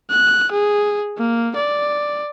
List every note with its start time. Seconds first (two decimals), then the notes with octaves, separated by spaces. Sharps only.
0.11 F#6
0.51 G#4
1.18 A#3
1.56 D5